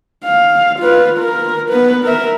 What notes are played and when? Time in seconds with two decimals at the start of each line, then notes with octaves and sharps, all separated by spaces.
0.25 F5
0.79 F4 B4
1.19 A#4
1.71 B3 B4
2.04 A#4 E5